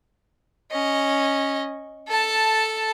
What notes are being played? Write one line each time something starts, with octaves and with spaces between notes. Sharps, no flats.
C#4 D#5
A4 A5